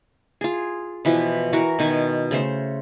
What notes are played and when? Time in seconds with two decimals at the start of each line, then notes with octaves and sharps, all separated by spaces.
0.41 F4 G#4
1.05 B2 E3 F3
1.53 E3 F#4 A#4
1.79 B2 D#3 G#5
2.31 C#3 A3 C5